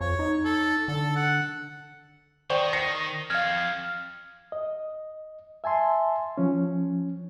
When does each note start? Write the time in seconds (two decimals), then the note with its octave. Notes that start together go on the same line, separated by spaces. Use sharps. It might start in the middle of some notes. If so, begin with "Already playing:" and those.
0.01 F2 C#5
0.19 D#4
0.45 A4
0.88 D3 A4
1.16 F#5
2.50 D#3 C5 D5 G5 C#6
2.73 A#6 C7 C#7
3.30 F2 F5 F6 G#6
4.52 D#5
5.64 E5 G#5 A5 C6
6.38 F3 C#4